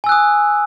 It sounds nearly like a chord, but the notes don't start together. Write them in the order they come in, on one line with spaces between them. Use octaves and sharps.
G#5 E6 F#6 D#6